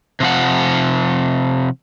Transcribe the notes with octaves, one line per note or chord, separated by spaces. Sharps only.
C3 F3 F#5